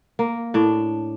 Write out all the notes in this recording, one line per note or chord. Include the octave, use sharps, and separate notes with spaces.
A#3
A2 D4